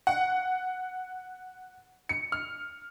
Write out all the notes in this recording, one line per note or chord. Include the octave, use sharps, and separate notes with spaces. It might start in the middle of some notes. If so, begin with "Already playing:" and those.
F#5
C#7
F6